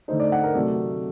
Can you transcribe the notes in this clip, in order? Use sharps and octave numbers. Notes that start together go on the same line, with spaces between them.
D3 A3 D#4 C5
D5
F#5
A#4
C3 F#3 A3 D5